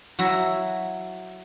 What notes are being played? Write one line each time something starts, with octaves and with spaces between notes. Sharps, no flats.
F#3 E4 F#4